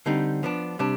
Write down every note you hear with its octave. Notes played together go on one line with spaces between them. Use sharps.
D3 G3 C4 D#4
F3 B3 D4
C3 G3 D4